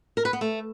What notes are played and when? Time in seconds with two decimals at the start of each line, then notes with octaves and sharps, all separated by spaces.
0.17 A#4
0.25 B4
0.33 B3
0.41 A3